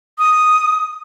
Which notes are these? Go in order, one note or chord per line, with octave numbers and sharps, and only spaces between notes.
D#6